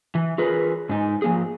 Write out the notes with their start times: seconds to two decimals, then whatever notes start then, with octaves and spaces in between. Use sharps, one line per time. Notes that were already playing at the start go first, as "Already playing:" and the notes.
0.15 E3
0.38 F4 G#4 A#4 B4
0.89 G#2 D#4
1.22 F3 A#3 G#4